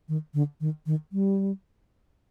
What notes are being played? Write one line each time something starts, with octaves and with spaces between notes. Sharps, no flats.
D#3
D3
D#3
D#3
G3